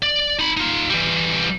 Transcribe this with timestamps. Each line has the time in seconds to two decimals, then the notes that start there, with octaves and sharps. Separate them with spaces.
0.02 D5
0.39 D#4 B5
0.57 D#4 F4
0.90 E3 G3